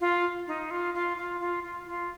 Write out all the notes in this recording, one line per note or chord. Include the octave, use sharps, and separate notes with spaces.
F4
D#4
F4
F4
F4
F4
F4
F4